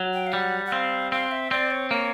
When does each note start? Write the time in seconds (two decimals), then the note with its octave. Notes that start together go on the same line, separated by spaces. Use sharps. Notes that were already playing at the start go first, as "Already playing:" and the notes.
Already playing: F#3
0.14 G5
0.27 F5
0.33 G3 F#5
0.66 F#5
0.72 C4 F5
1.12 C4 F5
1.32 E5
1.51 C4 D5
1.71 C#5
1.91 A#3 C#5